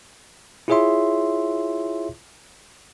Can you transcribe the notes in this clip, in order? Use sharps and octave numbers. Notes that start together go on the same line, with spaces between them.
E4 F4 G#4 C#5 E5 C6